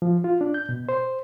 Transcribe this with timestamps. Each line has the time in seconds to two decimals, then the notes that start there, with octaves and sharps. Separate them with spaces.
0.02 F3
0.24 F4
0.41 D4
0.54 G6
0.69 B2
0.89 C5